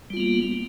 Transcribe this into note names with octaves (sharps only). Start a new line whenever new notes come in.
G3 A#3 B3 F4